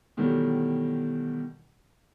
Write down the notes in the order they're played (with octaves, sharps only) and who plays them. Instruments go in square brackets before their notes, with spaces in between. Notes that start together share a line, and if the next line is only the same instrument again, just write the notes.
[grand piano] B2 D#3 E3 F#3 G3 A3